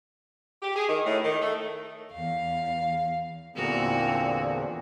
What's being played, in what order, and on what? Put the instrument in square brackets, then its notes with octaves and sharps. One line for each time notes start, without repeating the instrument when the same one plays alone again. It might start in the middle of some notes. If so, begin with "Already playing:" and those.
[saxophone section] G4
G#4
D#3
A2
D#3
A3
[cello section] E2 [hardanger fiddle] F5
[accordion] E2 A#2 D3 [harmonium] A#3 C4 G#4 [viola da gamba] F#4 A#4